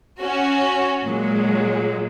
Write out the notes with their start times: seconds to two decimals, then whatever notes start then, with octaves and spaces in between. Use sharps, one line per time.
0.19 C#4 F#4
1.04 A#2 F#3 G#3